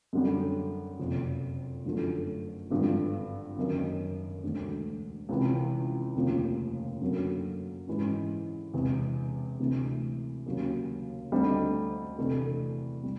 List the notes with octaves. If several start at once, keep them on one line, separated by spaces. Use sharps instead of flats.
F#2 D3 G3
F#1 F2 C3
G1 F#2 D3 F3 A3
G#1 G2 D3 F3
F#1 F#2 D#3
E1 D2 D3
C#2 C3 E3
F1 D#2 C#3 F3
F#2 D3 F#3 A#3
G#2 E3 G#3 C#4
E1 E2 C3
D2 C3 E3
D#2 C#3 F#3
D2 D3 G3 C4 D#4
E2 C3 E3 A3 D4
G3